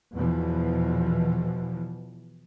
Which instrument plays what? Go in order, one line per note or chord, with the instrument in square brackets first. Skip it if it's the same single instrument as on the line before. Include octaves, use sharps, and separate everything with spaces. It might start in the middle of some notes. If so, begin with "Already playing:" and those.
[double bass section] E2 B2 E3 F3